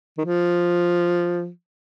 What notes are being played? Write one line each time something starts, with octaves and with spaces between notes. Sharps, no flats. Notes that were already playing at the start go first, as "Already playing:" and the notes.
D#3
F3